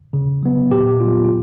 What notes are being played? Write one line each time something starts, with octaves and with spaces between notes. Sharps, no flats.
C#3
F#3 B3
A#2 G4
F#3 B3 F4
F4